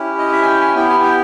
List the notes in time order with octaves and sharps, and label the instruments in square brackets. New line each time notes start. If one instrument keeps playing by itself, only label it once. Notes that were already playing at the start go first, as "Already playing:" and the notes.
Already playing: [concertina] C#4 E4 G4
D#5
E5
G#5
G5
G#5
B3 E4 G4 G5
G#5
G5